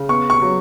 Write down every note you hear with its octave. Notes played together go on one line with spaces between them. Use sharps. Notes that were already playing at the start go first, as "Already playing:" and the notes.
Already playing: C#3
B3 C#6
C#6
F#3